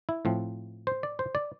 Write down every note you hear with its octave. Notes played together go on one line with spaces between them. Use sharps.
E4
A2 F3 C4
C5
D5
C5
D5